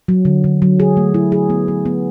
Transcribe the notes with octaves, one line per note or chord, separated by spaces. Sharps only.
F#3
D3
D3
F#3
G#4
A3
E4
G#4
B3
B3
B3